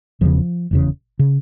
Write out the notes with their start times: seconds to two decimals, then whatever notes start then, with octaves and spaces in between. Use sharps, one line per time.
0.21 E1 E2 C#3 F3
0.71 F1 E2 C#3
1.19 C#3